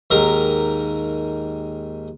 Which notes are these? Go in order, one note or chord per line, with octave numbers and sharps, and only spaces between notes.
D#2 G#2 A#4